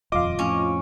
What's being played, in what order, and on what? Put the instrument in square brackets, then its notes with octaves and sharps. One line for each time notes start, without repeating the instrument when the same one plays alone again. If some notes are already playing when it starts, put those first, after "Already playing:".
[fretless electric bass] D#1 F2 [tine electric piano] F4 F5 [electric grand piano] D#5 D6
[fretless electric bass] F2 A2 F3 [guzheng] C#4